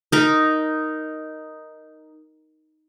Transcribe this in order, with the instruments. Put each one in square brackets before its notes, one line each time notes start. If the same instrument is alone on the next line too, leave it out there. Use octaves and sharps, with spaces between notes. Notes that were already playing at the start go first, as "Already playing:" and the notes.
[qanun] D#4 A#4